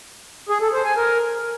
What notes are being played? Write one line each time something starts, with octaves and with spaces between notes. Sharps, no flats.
G#4
A4
C5
G#5
A#4